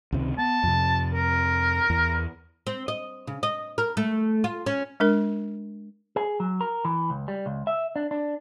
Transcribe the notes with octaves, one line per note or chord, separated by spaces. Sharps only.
C#2 C3 D#3
B3 A5
F2 C3
A#4
E2
C4
D#5
C#3
D#5
A#4
A3
F4
C#4
G#3 D4 A#4
G#4
F#3
A#4
E3
C#2
G3
C#2
E5
D4
D4